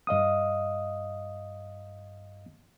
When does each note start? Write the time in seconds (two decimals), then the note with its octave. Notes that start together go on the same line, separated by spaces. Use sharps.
0.07 G2 D#5 F5 D#6